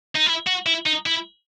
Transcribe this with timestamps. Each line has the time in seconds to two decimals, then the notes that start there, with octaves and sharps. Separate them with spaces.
0.15 D#4
0.26 E4
0.47 F#4
0.67 E4
0.86 D#4
1.06 E4